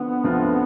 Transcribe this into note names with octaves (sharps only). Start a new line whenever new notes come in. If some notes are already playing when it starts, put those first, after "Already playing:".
Already playing: D3 F3 B3 C4
D2 D3 F3 C4 F4